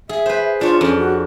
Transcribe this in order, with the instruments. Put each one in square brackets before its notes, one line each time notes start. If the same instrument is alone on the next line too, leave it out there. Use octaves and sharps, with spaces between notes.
[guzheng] G#4 [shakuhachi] E5
[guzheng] B4 C5
[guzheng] D4 C#5 [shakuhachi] F4
[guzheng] F2 [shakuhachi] C#4
[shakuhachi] F#4